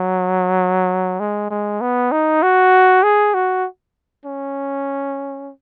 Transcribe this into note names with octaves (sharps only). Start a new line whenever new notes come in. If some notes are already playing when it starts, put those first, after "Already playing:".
Already playing: F#3
G#3
G#3
B3
D#4
F#4
G#4
F#4
C#4